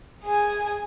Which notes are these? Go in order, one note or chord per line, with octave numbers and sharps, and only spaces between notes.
G#4 G#5